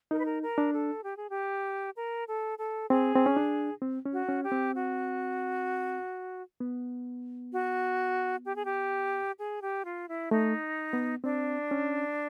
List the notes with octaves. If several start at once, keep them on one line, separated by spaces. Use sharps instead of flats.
D#4 A#4
B4
A#4
A#4
D4
A4
G4
G#4
G4
A#4
A4
A4
C4 G#4
C4
C#4
D4
C4
C#4
F#4
C#4
G4
C4
F#4
B3
F#4
G4
G#4
G4
G#4
G4
F4
E4
A3 D#4
B3
C4 D4
C#4